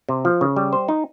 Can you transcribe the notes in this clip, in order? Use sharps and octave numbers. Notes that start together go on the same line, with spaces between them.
C3
F3
C#3
G3
C5
D#4